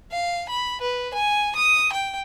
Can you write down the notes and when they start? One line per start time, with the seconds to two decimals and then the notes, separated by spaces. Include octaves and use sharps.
0.12 F5
0.49 B5
0.81 B4
1.14 G#5
1.56 D#6
1.93 G5